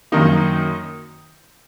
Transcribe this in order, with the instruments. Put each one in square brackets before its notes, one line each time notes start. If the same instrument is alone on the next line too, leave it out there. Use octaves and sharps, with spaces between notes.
[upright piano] F#2 D#3 A#3 D#4